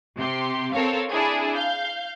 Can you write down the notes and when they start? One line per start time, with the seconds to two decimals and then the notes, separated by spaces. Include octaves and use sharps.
0.17 C3 G4 C6
0.73 C4 A4 A#4 C#5 F5
1.10 D4 E4 G#4
1.54 F5 G6